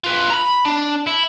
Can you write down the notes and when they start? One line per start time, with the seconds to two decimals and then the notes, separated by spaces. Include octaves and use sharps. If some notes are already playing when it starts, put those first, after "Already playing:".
0.04 F4 B4
0.30 A#5 B5
0.65 D4
1.07 E4